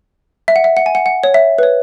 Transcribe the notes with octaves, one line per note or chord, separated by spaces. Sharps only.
E5
F#5
E5
F#5
G#5
F#5
F#5
C#5
E5
B4
C#5